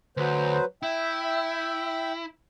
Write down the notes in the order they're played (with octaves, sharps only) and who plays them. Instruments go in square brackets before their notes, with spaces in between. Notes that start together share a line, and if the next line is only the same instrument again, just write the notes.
[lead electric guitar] D2 [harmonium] F#3 B4 C5
[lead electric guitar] E4 [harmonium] E5 G5